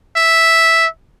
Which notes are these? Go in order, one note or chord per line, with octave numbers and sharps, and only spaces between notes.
E5